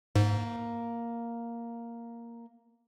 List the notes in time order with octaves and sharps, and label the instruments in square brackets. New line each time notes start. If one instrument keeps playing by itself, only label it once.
[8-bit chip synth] G#2 [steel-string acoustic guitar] A#3